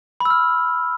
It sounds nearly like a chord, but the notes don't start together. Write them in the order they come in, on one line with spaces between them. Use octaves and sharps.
B5 E6 F6